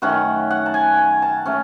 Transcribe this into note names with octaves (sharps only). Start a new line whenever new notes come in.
F#2 D#3 A3 C#4 F#5
F#5
A5
G#5
G#5
A5
A3 C#4